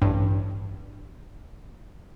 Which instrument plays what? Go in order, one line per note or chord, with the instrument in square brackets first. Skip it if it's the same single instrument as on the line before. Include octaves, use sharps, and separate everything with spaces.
[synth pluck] A1 G2